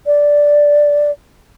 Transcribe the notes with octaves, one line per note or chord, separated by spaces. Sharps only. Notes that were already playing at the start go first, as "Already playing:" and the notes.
D5